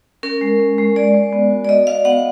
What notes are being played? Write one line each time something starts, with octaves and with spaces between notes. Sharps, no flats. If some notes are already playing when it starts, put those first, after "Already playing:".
C#4 A#4
G#3
C#4
G#3
G#3 D5
G#3
B3
F#4
D5
F#4 D#5
F#4 F5
B3 F#5